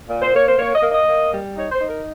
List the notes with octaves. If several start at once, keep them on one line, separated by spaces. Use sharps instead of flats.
A#2
C5
A#3 C#5
C5
A#3 C#5
D#5
A#3
D#5
A#3
G3
D#4 C#5
C5
D#4
A#4